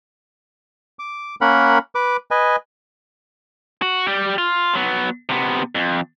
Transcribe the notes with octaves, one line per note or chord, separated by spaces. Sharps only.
D6
A#3 C#4 A#4 F#5 B5
B4 D6
B4 D#5 G#5
F#4
G3 G4
F4
F#3 B3
C3 B3
F2